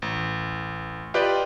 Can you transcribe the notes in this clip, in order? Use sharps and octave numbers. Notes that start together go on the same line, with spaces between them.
A1
F4 G4 B4 D5 D#5 G5